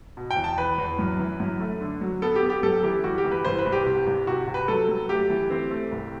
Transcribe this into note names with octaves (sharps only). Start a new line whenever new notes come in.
B2
G5
E2
A5
E2 B4
E2
F#2
E3
F#2
A3
D3
F#3
B3 A4
G4
B3
G4
F#2 A4
E3 G4
G3 F#4
G4
E3
B4
C2 C5
B4
C2
G4
C3
C2
C3 F#4
C3
B4
F#3 A4
F#3
A3 G4
E3
C4
A3
C2